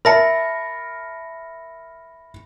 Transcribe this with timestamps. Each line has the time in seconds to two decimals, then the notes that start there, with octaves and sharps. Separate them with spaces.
0.05 A#4 E5 A5 B5 A#6 C#7